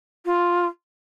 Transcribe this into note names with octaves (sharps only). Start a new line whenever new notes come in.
F4